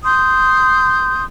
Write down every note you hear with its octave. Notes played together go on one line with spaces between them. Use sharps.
C6 D#6 G6